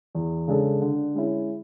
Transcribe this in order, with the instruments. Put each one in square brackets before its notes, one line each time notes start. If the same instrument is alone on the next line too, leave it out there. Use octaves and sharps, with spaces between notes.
[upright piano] E2
C#3 G#3 D4 A4
D3
G#3 C#4 E4